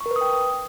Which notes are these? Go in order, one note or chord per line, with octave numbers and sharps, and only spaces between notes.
C#6
A#4
B4
D#6
G5